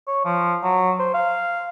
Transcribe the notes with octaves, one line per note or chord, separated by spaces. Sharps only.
C#5
F3
F#3
C5
F5